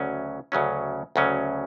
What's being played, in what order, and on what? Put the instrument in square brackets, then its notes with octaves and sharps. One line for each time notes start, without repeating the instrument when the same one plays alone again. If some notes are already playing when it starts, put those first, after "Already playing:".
Already playing: [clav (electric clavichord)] D2 C#3 F#3 C#4
D2 C#3 F#3 C#4
D2 C#3 F#3 C#4